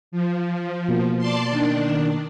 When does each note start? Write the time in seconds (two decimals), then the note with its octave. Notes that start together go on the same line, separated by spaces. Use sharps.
0.12 F3
0.89 B2 A#3 B3
1.18 D5 A5 C6
1.50 D#3 D4